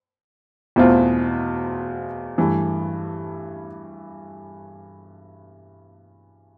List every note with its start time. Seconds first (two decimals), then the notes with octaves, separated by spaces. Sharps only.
0.76 E2 B2 A3 C4 F4
2.38 G2 E3 A3